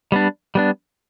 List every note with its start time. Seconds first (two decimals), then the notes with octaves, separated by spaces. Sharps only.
0.12 G3 B3 D4
0.55 G3 B3 D4